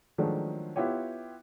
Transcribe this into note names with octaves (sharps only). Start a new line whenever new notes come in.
D#3 F3 F#3 G#3 A3 D4
B3 E4 F4 G4 C#5